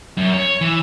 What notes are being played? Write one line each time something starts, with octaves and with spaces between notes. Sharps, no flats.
F#2
C#5
E3